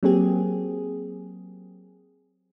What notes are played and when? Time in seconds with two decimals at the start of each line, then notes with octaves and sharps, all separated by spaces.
0.03 F#3 A#3 C4 G4 G#4